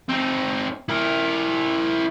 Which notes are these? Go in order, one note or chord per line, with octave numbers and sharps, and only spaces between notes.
C4 D#4
E4 A#4